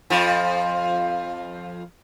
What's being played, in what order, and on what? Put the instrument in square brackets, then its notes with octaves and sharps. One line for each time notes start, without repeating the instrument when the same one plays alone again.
[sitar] F2 F3